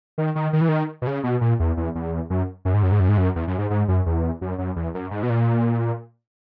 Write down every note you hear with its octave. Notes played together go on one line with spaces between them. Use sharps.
D#3
D#3
D#3
E3
D#3
B2
C#3
B2
A#2
E2
E2
E2
F#2
F#2
G#2
F#2
G#2
F#2
G#2
F#2
E2
F#2
G#2
G#2
F#2
E2
F#2
F#2
E2
F#2
G#2
B2
A#2